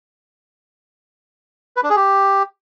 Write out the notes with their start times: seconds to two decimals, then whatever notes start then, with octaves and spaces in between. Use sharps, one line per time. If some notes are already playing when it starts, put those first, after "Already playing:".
1.77 B4
1.83 D4
1.90 G#4
1.96 G4